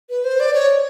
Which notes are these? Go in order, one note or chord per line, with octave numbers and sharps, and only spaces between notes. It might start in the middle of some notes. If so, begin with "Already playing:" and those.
B4
C5
D5
C#5